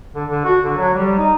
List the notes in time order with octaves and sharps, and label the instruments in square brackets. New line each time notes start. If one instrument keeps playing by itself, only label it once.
[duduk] D3
D3
F#4
D3
F#3
G3
D#4